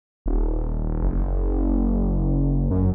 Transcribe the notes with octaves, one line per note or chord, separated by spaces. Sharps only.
D#1
F#1
F#2